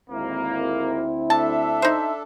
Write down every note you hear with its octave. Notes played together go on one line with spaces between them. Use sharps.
G#1 D2 A#3 C4 E4
D4 A4 E5 A5
D#4 C5